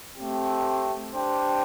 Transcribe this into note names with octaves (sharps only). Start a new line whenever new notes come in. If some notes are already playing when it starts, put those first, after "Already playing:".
A3 C4 G4
D4 G4 C5 G5